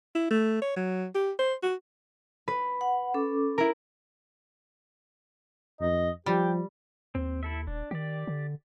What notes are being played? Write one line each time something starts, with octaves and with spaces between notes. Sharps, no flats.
E4
A3
C#5
F#3
G4
C5
F#4
B4
F#5
C#4 A4 D6
E4 A#4
F2 D#5
F3 G3 G4
D#2 C4
E4 A4 E5
D#1 D4
D#3 G4 D5
D3